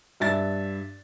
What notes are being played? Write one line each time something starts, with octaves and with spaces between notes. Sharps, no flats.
G2 E5 A6